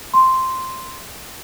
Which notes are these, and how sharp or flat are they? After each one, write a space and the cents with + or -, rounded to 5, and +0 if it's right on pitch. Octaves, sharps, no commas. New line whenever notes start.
C6 -5